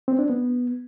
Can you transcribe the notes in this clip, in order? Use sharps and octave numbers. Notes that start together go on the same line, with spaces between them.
C4
D4
B3